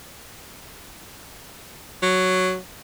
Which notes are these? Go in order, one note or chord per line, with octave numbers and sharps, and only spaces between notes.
F#3